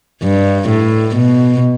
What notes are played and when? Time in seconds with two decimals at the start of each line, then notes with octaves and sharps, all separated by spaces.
0.23 G2
0.69 A2
1.16 B2